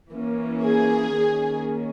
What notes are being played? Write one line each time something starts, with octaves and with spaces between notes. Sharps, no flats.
E3 A#3 C#4
G#4
D#3 A#3 C#4